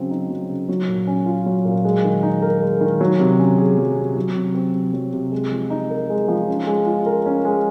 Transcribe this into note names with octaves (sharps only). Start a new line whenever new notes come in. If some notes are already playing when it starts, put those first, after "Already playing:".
Already playing: C#3 F#3 C4
D#4
F#3
C#3
F#3
A#2
C#4
F4
F#3
A#2
G#3
D#3
D#4
A#4
G#3
D#3
F#3
C3
C#4
G#4
F#3
C3
F#3
C3
C4
C3
F#3
C3
G#3
F3
D#4
A#4
G#3
F3
C#4
G#3
F4
A#4
C#4
G#3